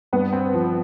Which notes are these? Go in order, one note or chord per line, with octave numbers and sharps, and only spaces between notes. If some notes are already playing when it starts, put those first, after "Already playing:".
G2 B3
C4
F3